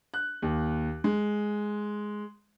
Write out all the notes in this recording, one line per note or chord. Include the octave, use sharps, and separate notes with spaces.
F#6
D#2
G#3